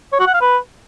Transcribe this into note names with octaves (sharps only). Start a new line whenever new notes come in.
C#5
F#4
F#5
F5
B4